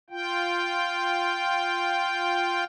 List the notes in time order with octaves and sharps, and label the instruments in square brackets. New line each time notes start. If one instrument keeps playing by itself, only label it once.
[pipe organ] F4 G5